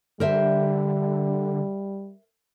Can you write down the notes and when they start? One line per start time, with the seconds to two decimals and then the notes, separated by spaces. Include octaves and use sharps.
0.20 D3 G3 A#4 C5 E5